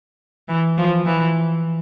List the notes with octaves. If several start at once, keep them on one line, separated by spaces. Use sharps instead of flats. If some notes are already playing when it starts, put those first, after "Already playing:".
E3
F3
E3